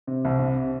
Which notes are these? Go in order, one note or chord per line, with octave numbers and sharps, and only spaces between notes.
C3
C2
C3